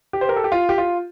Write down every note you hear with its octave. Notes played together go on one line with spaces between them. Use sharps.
G4
C5
A#4
A4
G4
F4
G4
F4